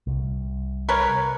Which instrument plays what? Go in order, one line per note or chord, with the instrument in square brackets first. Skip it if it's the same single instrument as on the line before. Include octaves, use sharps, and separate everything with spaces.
[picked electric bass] C2
[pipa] A#4 B4 C#5